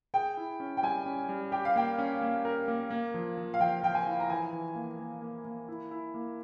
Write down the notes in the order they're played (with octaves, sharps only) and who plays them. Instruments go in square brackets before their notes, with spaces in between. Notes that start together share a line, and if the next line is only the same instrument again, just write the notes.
[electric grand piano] G#4 [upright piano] G5
[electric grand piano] E4
C#4
[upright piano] G5
[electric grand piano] G3 [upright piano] G#5
[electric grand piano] C#4
G3
[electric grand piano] G4 [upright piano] G5
[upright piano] F5
[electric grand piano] A#3 [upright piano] G5
[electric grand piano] C#4
A#3
A#4
A#3
A#3
F3
F3
[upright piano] F5
[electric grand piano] F3 [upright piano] G5
[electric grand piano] F3 [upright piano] G5
[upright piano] G#5
[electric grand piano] E4
[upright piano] A#5
[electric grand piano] E3 [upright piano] G#5
[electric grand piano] E3
A#3
A#3
A#3
A#3
E4
E4
A#3